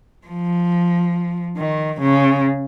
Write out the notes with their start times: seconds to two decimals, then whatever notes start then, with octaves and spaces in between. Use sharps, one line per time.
0.27 F3
1.57 D#3
2.01 C#3